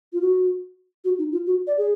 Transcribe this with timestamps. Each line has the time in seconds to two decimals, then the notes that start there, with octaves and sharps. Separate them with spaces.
0.13 F4
0.22 F#4
1.05 F#4
1.19 D#4
1.32 F4
1.47 F#4
1.67 D5
1.78 G#4